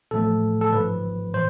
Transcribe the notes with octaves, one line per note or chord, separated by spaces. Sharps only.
A1 A2 F3 A3 A4
A4
G#1 G#2 F3 B4
A2 E3 C5